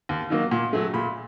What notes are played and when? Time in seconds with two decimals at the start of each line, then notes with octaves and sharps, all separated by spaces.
0.09 D#2
0.30 D#3 F#3 A#3
0.52 A#2
0.73 F#3 A3
0.94 A#2 B5